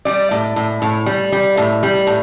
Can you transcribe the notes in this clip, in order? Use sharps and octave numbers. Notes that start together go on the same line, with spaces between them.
G3 D5
A2
A2
A2
G3
G3
A2
G3
A2